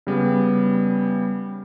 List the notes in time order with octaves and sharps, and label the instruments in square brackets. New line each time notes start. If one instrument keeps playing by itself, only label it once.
[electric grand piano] C#3 G3 B3